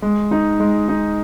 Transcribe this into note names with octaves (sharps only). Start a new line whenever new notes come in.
G#3
D#4
G#3
D#4